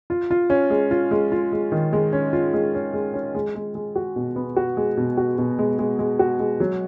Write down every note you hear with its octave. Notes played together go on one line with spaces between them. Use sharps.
F4
F4
C#4
G#3
F4
G#3
F4
G#3
D#3
G#3
C#4
F4
G#3
C#4
G#3
C#4
G#3
G#3
G#3
F#4
B2
B3
F#4
G#3
B2
F#4
B2
G#3
G#3
G#3
F#4
G#3
F#3